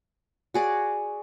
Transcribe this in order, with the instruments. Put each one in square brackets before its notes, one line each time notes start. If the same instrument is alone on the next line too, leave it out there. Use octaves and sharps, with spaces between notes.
[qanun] F#4 G#4 D5